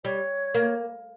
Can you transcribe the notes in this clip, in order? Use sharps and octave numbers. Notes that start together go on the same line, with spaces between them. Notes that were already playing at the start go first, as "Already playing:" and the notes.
G3 C#5
A#3